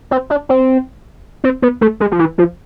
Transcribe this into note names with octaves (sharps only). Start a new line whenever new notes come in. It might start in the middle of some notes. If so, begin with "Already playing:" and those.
C4
D4
C4
C4
B3
A3
G#3
F3
E3
F3